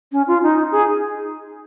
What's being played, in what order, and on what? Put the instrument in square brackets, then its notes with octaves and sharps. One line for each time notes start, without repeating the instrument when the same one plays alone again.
[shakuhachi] C#4
F4
D#4
G#4